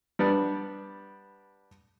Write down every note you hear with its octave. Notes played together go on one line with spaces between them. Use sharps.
G3 B3 D4